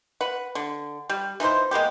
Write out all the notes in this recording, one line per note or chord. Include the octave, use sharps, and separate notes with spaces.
B4 F#5
D3
G3
E3 D#4 F4 C5
G#3 A#3 B3 G4